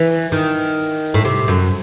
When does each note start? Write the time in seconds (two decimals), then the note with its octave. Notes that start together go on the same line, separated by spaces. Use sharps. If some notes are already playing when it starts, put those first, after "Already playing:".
Already playing: E3
0.32 D#3
1.14 A2
1.25 C3
1.48 F#2